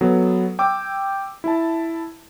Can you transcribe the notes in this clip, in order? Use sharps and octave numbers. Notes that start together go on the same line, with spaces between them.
F#3 B3 A4
G5 D6 E6
E4 A5